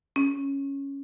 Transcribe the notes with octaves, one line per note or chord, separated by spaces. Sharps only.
C#4